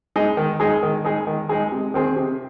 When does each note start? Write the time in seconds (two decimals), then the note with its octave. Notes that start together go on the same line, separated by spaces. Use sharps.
0.16 G#3 D#4 G#4
0.37 D#3
0.60 G#3 D#4 G#4
0.83 D#3
1.04 G#3 D#4 G#4
1.27 D#3
1.49 G#3 D#4 G#4
1.72 C3
1.94 D#3 C4 G#4
2.16 C3